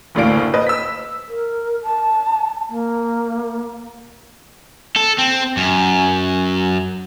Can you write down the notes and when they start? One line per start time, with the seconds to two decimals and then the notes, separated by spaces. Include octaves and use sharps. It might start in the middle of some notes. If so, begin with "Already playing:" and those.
0.15 F#1 D2 A2 D5 F5 D7
0.54 B4 C5 D#5
0.67 E6 B6
1.28 A#4
1.83 A5
2.69 A#3
4.96 A4
5.18 C4
5.57 F#2